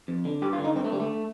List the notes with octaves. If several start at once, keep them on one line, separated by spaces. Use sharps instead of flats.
F2
D3
G2 G4
F4
D3
D#4
G2 C4
A3
D3 G3
A3